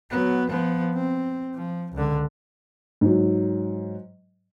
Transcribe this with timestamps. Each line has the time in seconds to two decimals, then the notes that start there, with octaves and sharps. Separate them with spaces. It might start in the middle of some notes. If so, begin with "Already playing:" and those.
0.10 F#3 B3
0.49 F3 B3
0.94 C4
1.55 F3
1.93 C#2 D3
3.01 G#2 F#3